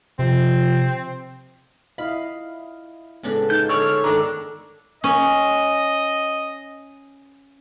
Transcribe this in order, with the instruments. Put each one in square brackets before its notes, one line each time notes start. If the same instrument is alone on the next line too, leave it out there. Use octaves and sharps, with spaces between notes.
[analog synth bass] C3 [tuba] F3 [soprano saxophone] C4
[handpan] E4 D#5 F5 [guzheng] B5
[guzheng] A2 C#3 D4 [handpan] G#3 B3
[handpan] D#4 [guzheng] F4 A5 [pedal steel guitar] G6
[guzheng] D3 G#4 D5 [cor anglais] C#5 [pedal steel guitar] E6 F6
[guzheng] G#2 D#3 A3 [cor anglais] D4 [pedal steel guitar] A#5 E6
[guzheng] C#4 [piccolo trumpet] D#5